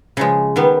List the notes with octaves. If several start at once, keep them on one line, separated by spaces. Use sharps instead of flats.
C#3 F3 G#3
D#3 G3 B3